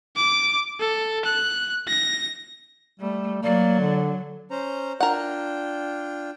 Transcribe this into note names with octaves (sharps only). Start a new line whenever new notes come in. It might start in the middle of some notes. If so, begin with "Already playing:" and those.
D6
A4
F#6
A#6
G3 A3
F#3 A#3 D5
D3
C#4 C5 A#5
D4 F4 A#4 F#5 G5